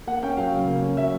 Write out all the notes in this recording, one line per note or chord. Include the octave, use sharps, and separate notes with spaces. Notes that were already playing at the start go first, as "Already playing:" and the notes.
A#3 F#5
C#4 G5
F#3 F5
C#3
A#3
C#4
F#3 E5